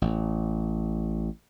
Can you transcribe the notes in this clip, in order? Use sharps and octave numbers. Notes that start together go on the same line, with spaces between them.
A1